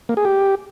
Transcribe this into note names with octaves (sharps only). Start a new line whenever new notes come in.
A#3
G#4
G4